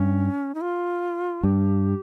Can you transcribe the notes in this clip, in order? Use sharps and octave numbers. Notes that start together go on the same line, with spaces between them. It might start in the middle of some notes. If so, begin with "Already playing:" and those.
Already playing: G2 C#4
D#4
F4
G2 G4